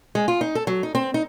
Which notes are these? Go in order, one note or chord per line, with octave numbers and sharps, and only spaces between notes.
G#3
F4
D#4
A4
F#3
D#4
C4
D#4